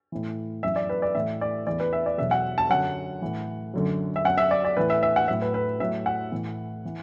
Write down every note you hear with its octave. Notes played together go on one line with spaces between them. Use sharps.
A2 E3
F#2 E3 E5
D5
B4
D5
A2 E3 E5
D5
E2 E3 D5
B4
E5
D5
E2 B2 F#3 E5
F#5
A5
F#2 D3 F#3 F#5
A2 E3
F#2 D3 F#3
E5
F#2 F#3 F#5
E5
D5
D5
A2 E3 B4
E5
E5
F#5
A2 F#3 E5
B4
B4
A2 F#3 E5
F#5
A2 E3
E3